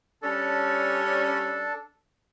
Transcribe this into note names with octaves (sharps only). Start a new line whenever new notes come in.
G3 C#4 D4 A4